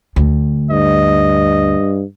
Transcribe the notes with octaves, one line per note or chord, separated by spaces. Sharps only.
D2
G2 D#5